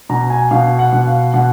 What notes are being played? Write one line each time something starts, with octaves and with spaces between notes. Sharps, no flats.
B2 A#5
G#5
B2 F5
F#5
B2
F5
B2 F#5